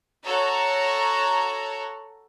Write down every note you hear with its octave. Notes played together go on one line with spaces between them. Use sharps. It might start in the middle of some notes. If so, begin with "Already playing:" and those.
F#4 A4 C#5 A#5